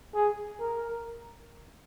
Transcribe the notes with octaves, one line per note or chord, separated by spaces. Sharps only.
G#4
A#4